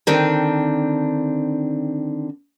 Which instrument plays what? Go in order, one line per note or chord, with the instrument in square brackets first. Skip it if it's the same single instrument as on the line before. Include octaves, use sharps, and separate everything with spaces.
[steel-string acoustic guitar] D3 D#3 C4 D4